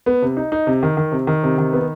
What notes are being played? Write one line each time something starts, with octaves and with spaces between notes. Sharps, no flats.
B3
C3
D#4
D#4
C3
D#3
D#3
C3
D#3
C3
D#3
B3